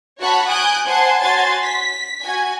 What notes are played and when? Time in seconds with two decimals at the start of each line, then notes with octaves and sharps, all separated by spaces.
0.20 F#4 C#5 F#5 A5 B5 C#6
0.48 G#5 D#6 F#6 G6 D7
0.87 C5 F#5 G#5 A5 C6
1.21 F#4 C#5 G#5 C6 A6
1.64 B6
2.23 F#4 G#5